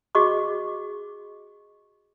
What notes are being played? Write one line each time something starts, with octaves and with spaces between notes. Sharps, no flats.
F#4 G#4 D#5 C#6 D6